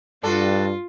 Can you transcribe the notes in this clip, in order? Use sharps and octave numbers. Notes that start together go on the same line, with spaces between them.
G2 D4 F4 F#4 A4